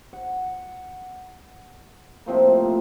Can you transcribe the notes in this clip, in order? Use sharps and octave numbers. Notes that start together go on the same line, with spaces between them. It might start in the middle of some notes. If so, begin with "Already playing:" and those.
F#5
A2 C3 F3 A#3